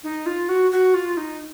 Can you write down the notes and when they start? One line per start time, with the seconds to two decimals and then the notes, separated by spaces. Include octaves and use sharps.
0.04 D#4
0.26 F4
0.49 F#4
0.72 F#4
0.94 F4
1.17 D#4